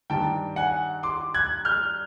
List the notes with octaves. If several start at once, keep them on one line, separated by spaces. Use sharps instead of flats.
G2 D#3 G3 G5 A5
F#5 G#5
C6 D6
F#6 G#6
F6 G6